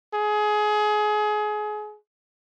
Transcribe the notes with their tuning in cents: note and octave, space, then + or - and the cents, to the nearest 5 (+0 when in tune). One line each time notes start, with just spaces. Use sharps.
G#4 +25